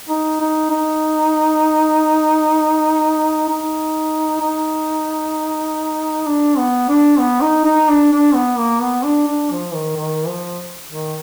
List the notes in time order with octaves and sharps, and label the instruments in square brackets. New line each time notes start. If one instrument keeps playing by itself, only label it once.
[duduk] D#4
D#4
D#4
D#4
D#4
D4
B3
D4
B3
D#4
D#4
D4
D4
B3
A#3
B3
D4
D4
F3
D#3
D#3
F3
D#3